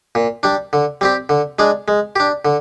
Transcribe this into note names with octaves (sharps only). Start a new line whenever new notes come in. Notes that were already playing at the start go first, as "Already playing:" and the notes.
A#2
G3 D4
D3
G3 C4 G4
D3
G#3 D4 G#4
G#3
D4 G4
D3